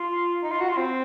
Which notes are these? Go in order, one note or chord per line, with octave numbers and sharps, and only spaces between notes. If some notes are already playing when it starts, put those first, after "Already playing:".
Already playing: F4
D#4
F4
F#4
F4
C4